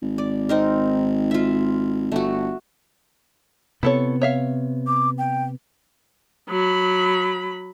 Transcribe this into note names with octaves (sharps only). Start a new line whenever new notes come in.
G#1
D5
C4 D#4 A#4
F4 E5
G1 A3 F#4
C3 B3 E4 A4 C#5
C#5 E5 F5
D6
G5
F#3 B5